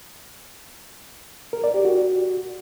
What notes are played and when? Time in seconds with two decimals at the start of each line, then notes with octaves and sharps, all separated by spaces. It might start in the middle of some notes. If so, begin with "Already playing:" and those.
1.53 A#4
1.64 D5
1.74 G4
1.85 F#4